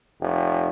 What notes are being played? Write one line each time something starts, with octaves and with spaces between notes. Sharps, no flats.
F1